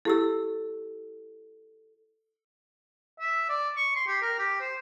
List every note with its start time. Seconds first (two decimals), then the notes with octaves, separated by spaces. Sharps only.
0.05 E4 G4 A4 E6
3.20 E5
3.49 D5
3.77 C#6
3.96 C6
4.07 G4
4.22 A#4
4.38 G4
4.61 C5